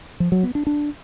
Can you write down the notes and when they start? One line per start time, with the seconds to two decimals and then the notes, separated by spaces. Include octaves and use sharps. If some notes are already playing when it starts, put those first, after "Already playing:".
0.20 F3
0.32 F#3
0.43 B3
0.55 D4
0.67 D4